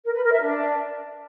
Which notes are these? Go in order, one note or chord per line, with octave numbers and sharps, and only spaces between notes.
A#4
B4
A#4
E5
D4